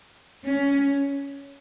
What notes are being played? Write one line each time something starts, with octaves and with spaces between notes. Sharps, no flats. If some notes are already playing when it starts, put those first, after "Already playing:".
C#4